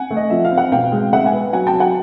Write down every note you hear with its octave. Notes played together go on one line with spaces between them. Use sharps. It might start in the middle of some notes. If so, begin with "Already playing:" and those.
Already playing: F#5 G#5
A3
D#5
F3 E5
F5
C4
F#5
B2 F5 G5
G#3
G#3 E5 F#5
F#5 G#5
B3
F#3 F#5 G#5
G5 A5
F#3
F#5 G#5